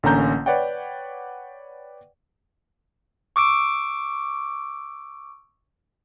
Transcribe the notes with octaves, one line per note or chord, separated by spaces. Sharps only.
A1 D3 A#3 C#4 A#5 G6
B4 C#5 D5 F#5 G5
C#6 D6 E6 D7